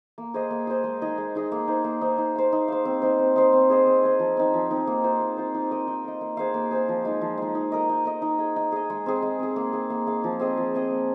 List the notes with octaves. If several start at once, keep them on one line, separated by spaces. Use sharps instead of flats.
A#3
G#4 C5 D#5
A#3
G#4 C5 D#5
G#3
D#4 G#4 D#5
G#3
D#4 G#4 D#5
A#3
D#4 C5
A#3
D#4 C5
D#4
C5 F5
D#4
C5 F5
C4
D#4 C5
C4
D#4 C5
C4
G#4 C5 D#5
C4
G#4 C5 D#5
F3
C4 D#4
F3
C4 D#4
A#3
F4 C5
A#3
F4 C5
D#4
A#4 D#5
D#4
A#4 D#5
A#3
G#4 C5 F5
A#3
G#4 C5 F5
F3
G#3 D#4
F3
G#3 D#4
D#4
A#4 D#5
D#4
A#4 D#5
D#4
G#4 D#5
D#4
G#4 D#5
G#3
C4 G#4
G#3
C4 G#4
A#3
G#4 F5
A#3
G#4 F5
F3
C4 G#4 D#5
F3
C4 G#4 D#5
A#3